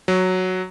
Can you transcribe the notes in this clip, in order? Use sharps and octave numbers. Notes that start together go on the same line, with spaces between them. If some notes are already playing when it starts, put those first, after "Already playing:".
F#3